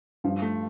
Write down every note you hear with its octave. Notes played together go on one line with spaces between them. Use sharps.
G2 F3
A3